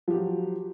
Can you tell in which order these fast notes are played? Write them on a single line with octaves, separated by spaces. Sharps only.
F3 G4 F#3